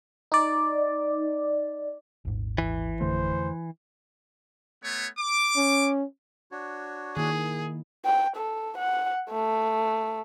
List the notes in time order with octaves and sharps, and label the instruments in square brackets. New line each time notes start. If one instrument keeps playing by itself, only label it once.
[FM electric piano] D#4 D5
[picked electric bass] D#1 G#2 [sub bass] G#1
[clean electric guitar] E3
[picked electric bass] F2 D3 A3 [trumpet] C5
[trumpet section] A3 B3 C#5
D6
[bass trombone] C#4
[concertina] D4 F#4 C#5
[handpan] D#3 A#3 E4 [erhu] G#4
[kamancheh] G5
A4
F#5
A3